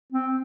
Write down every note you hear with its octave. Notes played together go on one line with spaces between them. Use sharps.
C4